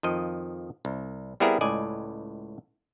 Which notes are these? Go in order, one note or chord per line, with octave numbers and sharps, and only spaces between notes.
F2 D#3 F3 D#5
C2
G3 B3 C4 E4 G#4 A#4
C#2 A2 D5 D#5 G#5